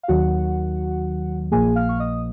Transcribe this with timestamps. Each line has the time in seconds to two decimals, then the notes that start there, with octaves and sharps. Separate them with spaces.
0.03 F5
0.08 D#2 D#3 F#3 F#4 F#5
1.51 A#1 A#2 F3 A#3 G#4 G#5
1.76 F5 F6
1.89 C#6
2.00 D#5 D#6